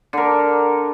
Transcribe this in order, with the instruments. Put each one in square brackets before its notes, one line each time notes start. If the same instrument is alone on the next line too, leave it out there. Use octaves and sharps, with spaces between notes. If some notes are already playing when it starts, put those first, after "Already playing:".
[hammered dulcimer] D3 A#4